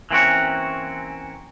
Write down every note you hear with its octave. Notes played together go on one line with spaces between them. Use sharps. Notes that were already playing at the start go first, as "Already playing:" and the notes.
E3 A#3 C4 C#4 F#4